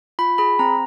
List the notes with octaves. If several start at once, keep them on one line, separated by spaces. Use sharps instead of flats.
F4 B5
G#4 B5
C4 A#5